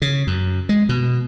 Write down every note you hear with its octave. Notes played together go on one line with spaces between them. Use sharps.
C#3
F#2
G#3
B2